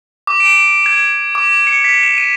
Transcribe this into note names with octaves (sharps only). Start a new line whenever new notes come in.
D6
D7
G#6
D6
C#7
B6
E7
D#7